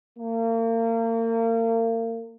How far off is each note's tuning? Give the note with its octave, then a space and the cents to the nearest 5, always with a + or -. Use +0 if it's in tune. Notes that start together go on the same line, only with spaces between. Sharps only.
A#3 -35